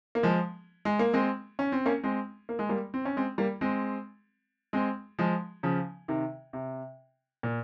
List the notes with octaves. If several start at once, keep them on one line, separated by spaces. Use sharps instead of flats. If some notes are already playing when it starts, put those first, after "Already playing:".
A#3
F3 G#3
G#3
A#3
G#3 C4
C#4
C4
A#3 C#4
G#3 C4
A#3
G#3
G3 A#3
C4
C#4
G#3 C4
G3 A#3
G#3 C4
G#3 C4
F3 G#3
C#3 F3
C3 D#3
C3
A#2